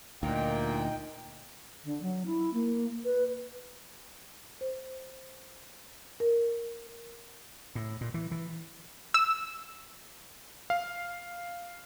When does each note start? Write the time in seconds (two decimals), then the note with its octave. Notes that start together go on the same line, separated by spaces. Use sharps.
0.23 D2 A#2 D#4 G5
1.84 D3
2.01 F#3
2.25 E4
2.53 A#3
3.04 B4
4.61 C5
6.20 A#4
7.75 A2
8.01 A#2
8.14 E3
8.31 E3
9.14 E6
10.70 F5